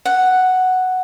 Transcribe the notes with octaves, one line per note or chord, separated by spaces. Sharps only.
F#5